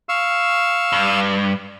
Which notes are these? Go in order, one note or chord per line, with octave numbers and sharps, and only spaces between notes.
F5 C#6 E6
G2